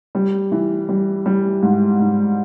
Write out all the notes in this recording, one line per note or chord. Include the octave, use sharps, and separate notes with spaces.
G3
E3
G3
G3
G#2
G#2